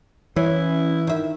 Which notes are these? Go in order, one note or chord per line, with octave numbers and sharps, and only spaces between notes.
E3 C#4 E4
D#3 E5